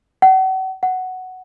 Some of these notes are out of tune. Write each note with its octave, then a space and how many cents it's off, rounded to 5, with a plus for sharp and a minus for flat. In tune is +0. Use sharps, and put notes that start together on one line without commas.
F#5 +40
F#5 +5